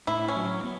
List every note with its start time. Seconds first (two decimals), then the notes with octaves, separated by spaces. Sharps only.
0.07 A2 E4
0.28 C#4
0.36 F#3
0.64 B3